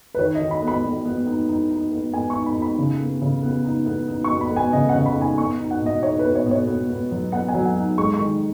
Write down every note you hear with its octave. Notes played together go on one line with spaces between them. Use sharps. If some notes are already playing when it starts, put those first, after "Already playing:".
B4
D#3 C#5
D#5
D#3
B5
B3
B5
B3
B3
D#4
D#4
D#4
B3
B3 G#5
C#6
D#4
B5
D#4
B5
C#3
B3
C#3
B3
D#4
B3
D#4
C#6
B3
B5
B3
G#5
C#3 D#5
F#5
C#3
B5
D#4
G#5
B3 C#6
D#4
F#5
B2 D#5
D#4 C#5
B4
B3
C#5
B2
C#5
B3
B3
F#3
B3 F#5
G#5
F#3
F#5
D#4
G#3 C#6
D#3 C#6